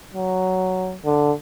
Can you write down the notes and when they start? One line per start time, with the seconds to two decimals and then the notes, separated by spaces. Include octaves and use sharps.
0.14 F#3
1.05 D3